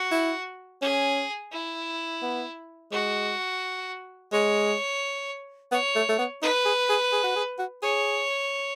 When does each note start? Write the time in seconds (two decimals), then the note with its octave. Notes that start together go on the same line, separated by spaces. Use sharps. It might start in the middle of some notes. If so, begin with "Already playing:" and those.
Already playing: F#4
0.12 E4
0.82 C#4 G#4
1.52 E4
2.22 B3
2.92 G#3 F#4
4.32 G#3 C#5
5.72 B3 C#5
5.95 A3
6.09 A3
6.19 B3
6.42 D#4 B4
6.65 G#4
6.90 G#4
7.12 G#4
7.24 F#4
7.36 G#4
7.59 F#4
7.83 G#4 C#5